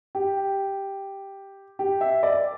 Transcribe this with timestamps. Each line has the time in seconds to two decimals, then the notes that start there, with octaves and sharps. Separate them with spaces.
0.15 G4
1.79 G4
2.01 E5
2.23 D5